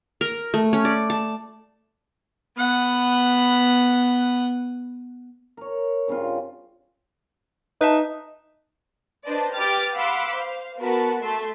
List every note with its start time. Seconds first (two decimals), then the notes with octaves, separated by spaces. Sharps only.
0.21 A#4
0.54 A3
0.73 C#4
0.85 D5
1.10 A5
2.57 B3 F#5
5.57 A#4 C#5
6.08 G2 C#3 C4 F4
7.81 D#4 B4 E5 A5
9.25 D4 B4 C5 D5 D#5 A5
9.54 G4 B4 D6 F6 A6 D7
9.94 F5 F#5 B5 C6 D6 E6
10.34 C5 F5
10.79 B3 F#4 A#4 B4 A5 B5
11.21 A3 E5 A5 C6 C7